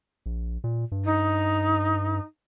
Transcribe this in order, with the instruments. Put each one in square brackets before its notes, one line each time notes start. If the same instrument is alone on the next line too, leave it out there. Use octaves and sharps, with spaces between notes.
[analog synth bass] A#1
A#2
G2
[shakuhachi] D#4